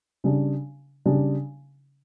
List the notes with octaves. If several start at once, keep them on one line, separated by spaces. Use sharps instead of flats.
C#3 G3 D4
C#3 G3 D4